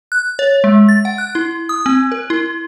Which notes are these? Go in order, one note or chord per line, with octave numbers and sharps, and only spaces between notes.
F#6
C#5
G#3
A6
F#5
F#6
E4
D#6
C4
A#4
E4